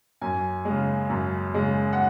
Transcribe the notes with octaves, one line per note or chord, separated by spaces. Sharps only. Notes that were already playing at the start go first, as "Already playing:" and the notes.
F#2 G#5
G#3
C#3
F#2
C#3 G#3
F#5